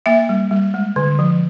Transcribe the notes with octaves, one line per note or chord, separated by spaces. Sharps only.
A#3 E5
G3
G3
G#3
D3
F3